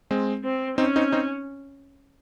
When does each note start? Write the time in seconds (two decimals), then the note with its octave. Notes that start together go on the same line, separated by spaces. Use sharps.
0.11 G#3 C4
0.44 C4
0.78 C4 C#4 D#4
0.96 C4 D#4
1.12 C4 D#4